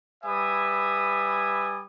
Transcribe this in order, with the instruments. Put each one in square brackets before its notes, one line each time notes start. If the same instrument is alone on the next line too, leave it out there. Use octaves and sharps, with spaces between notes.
[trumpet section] G3 B4 E5 G#5 D#6